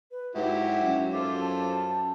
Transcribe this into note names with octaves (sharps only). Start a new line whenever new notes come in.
B4
G#2 F#3 E4 G4 F#5
F#2
F4 A4 C5 D6
A5